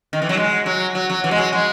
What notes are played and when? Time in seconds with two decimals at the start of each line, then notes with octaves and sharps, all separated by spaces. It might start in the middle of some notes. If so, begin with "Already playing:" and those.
0.13 D#3
0.22 E3
0.29 F#3
0.37 G#3
0.66 F#3
0.95 F#3
1.10 F#3
1.24 E3
1.31 G#3
1.38 F#3
1.53 G#3